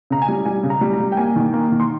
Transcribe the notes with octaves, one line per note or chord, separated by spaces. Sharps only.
C#3 A#5
G#5
G3
G3 G#5
C#3
A#5
G3
A#5
G3
G5
A#3 G#5
D#3
A#3
D#3
C6